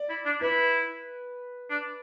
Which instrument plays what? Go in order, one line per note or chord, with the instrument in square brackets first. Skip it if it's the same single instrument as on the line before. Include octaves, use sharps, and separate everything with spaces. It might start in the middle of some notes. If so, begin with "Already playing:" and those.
Already playing: [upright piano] D5
[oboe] E4
D4
[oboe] E4 [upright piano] B4
[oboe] D4